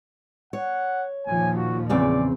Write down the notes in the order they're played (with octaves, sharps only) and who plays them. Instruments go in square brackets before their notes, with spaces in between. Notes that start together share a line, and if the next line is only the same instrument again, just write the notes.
[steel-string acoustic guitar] C#5 [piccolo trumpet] F#5
[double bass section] D#2 A#2 F3 [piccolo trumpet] G#5
[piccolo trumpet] F#4
[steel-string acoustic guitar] E2 C#3 C4 [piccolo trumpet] D5